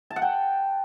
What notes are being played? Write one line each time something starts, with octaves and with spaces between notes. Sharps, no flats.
A5
F#5
G5